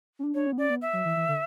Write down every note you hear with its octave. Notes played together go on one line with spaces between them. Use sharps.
C#4
D4
D4 C#5
C#4
B3
C#4 D5
B3
E5
F#3
E3
E3
D3